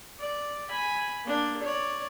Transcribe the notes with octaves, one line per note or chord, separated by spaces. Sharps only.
D5
G#5 B5
A#3 D4
C#5 D5